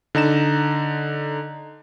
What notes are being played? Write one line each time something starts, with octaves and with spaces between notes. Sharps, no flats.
D3 D#4 A#5 E7